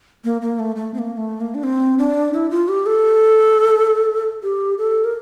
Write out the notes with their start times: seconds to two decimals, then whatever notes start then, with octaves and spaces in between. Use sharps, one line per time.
0.24 A#3
0.42 A#3
0.59 A3
0.76 A3
0.94 C4
0.99 A#3
1.17 A3
1.41 A#3
1.55 D4
1.63 C4
1.98 D4
2.34 E4
2.51 F4
2.68 G4
2.86 A4
4.43 G4
4.78 A4
5.04 A#4